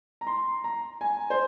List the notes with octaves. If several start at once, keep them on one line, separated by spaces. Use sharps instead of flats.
A#5
C6
A#5
G#5
C5